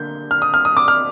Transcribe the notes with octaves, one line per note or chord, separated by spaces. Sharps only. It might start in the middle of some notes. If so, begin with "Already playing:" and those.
Already playing: D3 A#3 G6
F6
D#6
F6
D#6
D6
F6